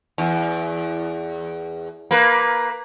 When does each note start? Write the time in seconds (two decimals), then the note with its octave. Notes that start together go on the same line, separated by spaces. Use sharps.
0.18 E2
2.11 A#3 B4